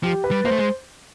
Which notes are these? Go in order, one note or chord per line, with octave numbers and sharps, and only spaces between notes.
F3 G4
B4
G3
A#3 C5
A3
G#3